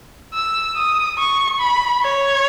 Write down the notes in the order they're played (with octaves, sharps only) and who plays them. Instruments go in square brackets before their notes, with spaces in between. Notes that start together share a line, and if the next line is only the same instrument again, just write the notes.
[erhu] E6
D#6
C#6
B5
C#5